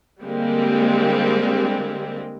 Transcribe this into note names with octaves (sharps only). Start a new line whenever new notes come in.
D3 G3 G#3 A#3 C4